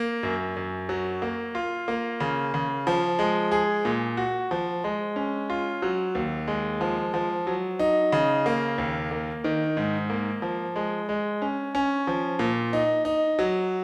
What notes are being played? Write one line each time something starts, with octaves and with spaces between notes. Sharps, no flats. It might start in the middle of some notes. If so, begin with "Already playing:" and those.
Already playing: A#3
F#2
F#2
F#3
A#3
F4
A#3
C#3
C#3
F3
G#3
G#4
A#2
F#4
F3
G#3
C#4
F4
F#3
D#2
G#3
F3
F3
F#3
D#4
C#3
A#3
D#2
A#3
D#3
G#2
A#3
F3
G#3
G#3
C#4
C#4
F3
A#2
D#4
D#4
F#3